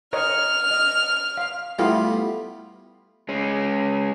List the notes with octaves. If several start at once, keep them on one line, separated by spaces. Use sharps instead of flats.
A#4 C#5 D#5 F6
D#5
F5
G3 A3 B3 E4 F4 F5
G#3 C#4